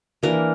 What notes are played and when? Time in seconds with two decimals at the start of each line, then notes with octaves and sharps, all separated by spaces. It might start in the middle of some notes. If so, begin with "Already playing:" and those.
0.23 E3 A#3 D4 A#4